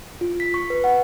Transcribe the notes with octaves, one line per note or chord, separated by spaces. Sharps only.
F4
B6
C#6
B4
F#5